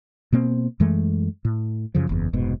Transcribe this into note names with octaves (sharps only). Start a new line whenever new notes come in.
B2 A#3 C4
F#2 E3 G#3 A3
A2
F#2 C#3 F3
F#1 E2
F1 G#2 B2